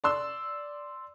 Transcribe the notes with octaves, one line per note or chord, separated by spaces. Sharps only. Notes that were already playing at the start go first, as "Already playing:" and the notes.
D5 C6 E6